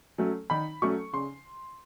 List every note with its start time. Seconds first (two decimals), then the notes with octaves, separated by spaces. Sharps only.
0.18 F#3 A3 C#4
0.50 D#3 B5
0.82 F#3 A3 C#4 C#6
1.13 C#3 C6